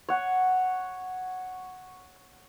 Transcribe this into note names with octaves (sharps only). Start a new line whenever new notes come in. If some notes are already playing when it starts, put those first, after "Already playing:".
C#5 F#5